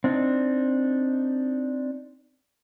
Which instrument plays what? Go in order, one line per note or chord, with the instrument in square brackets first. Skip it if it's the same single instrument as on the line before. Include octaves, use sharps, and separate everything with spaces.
[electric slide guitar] C4 D4 D#4